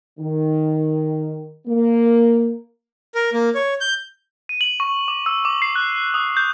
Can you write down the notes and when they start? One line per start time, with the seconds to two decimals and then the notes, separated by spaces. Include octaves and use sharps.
0.19 D#3
1.67 A#3
3.15 A#4
3.33 A#3
3.55 C#5
3.81 G6
4.49 D#7
4.61 F#7
4.80 C#6
5.08 D6
5.26 E6
5.45 D6
5.62 C7
5.76 F#6
6.14 D#6
6.37 G6